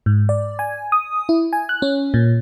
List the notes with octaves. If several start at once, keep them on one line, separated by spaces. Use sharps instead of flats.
G#2
D5
G#5
D#6
E4
G#5
F#6
C#4
A#2